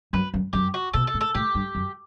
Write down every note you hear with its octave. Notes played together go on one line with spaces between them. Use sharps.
F#2 B4
F#2
F#2 G4
F#4
B2 A4
A4
A2
A4
A2 G4
G2
F#2